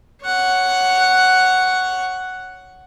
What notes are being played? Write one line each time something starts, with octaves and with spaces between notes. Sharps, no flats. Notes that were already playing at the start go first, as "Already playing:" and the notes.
C#5 F#5